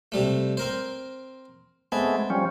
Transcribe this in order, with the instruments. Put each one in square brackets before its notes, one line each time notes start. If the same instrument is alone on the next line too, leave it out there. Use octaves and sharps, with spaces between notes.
[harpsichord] C3 G3 A3
C4 A#4 C5
[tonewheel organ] G#3 A3 B3 [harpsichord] C4
[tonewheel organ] F3 G3 C#4